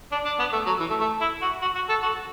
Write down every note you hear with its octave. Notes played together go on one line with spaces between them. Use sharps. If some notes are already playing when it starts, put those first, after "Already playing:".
D4
D4
B3
A3
F#3
E3
A3
A3
E4
F#4
F#4
F#4
A4
F#4